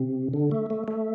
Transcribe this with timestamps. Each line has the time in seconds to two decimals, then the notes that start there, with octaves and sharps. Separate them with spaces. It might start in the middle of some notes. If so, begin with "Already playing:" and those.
Already playing: C3
0.33 D3
0.51 A3
0.70 A3
0.88 A3